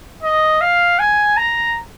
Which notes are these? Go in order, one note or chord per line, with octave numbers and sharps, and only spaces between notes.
D#5
F5
G#5
A#5